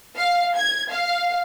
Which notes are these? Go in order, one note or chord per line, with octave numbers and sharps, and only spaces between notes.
F5
G#6
F5